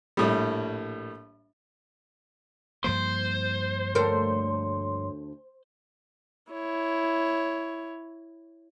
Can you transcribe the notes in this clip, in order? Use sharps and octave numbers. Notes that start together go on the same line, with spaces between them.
A#1 A2 G3
G2 F3 A#3 C5
D2 A4 A#4 C#5 C6
E4 C#5